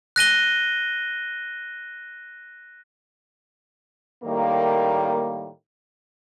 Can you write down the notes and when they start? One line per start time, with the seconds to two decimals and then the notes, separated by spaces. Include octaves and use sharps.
0.16 F#6 A#6 D#7 G7
4.23 A2 D#3 G3 A#3